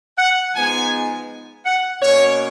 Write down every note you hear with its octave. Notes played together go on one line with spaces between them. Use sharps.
F#5
F3 G#3 B3 D#4 G#5
F#5
B2 A#3 C#4 C#5